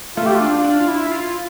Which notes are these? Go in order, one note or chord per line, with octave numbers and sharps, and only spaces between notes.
A3 F4
G4
F4
D4
D4
F4
E4
F4